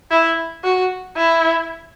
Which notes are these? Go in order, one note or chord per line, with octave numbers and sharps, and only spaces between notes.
E4
F#4
E4